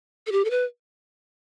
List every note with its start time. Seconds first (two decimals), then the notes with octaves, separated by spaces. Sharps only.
0.27 A4
0.32 G4
0.45 A4
0.50 B4